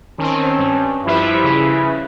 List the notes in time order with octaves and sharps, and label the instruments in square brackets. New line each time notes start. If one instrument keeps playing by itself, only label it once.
[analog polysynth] D#3 C4 [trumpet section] C#4 A5
[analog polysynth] G2
[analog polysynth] F3 G3 E5 [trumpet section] E4 B4
[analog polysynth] C#3